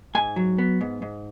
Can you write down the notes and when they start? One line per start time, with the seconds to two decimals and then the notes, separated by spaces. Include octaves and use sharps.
0.15 G#2 G#5
0.36 F#3
0.58 B3
0.81 G#2
1.02 G#2